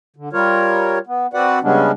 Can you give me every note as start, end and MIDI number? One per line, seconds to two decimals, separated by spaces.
0.16 0.29 50
0.33 0.98 55
0.33 0.98 65
0.33 0.98 70
0.33 0.98 73
1.07 1.27 59
1.33 1.59 60
1.33 1.59 66
1.33 1.59 71
1.33 1.59 74
1.33 1.59 78
1.63 1.91 49
1.63 1.91 55
1.63 1.91 56
1.63 1.91 59
1.63 1.91 61
1.63 1.91 62